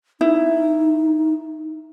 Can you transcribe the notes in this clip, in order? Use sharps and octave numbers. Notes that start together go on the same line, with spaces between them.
D#4 E4